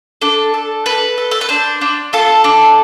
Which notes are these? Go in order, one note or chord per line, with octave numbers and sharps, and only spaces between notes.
D4 A4
A4
A4 B4
A4
A4
B4
D4 C5
D4
F4 A4
D4